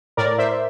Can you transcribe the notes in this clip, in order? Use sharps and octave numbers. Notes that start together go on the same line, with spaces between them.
A2 A#4 D5
C5 E5